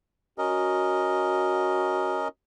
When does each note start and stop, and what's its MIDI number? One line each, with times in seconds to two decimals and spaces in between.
0.38 2.28 61
0.38 2.23 66
0.38 2.28 70
0.38 2.28 75